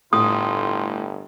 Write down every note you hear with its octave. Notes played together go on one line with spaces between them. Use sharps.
G1 A2 F4 D#6